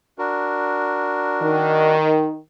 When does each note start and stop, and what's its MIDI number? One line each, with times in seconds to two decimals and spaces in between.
0.18 1.96 62
0.18 1.96 66
0.18 1.96 70
1.42 2.37 51